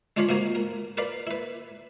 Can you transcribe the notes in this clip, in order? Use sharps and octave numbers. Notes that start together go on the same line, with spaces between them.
G#3 D4 F4 C#5 F5 B5
C#2 G#2 A#3 F#4 G#5 A#5
A#4
A#4 B4 D5 F5 B5
E4 B4